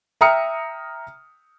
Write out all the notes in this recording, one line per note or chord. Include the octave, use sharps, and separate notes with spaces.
E5 G5 A#5 D#6 F6 C#7